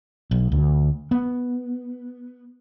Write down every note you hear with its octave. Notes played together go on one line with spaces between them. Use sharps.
B1
D2
B3